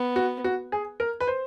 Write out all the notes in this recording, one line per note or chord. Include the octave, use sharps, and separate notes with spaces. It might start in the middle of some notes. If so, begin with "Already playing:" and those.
Already playing: B3
F#4
F#4
G#4
A#4
B4
C5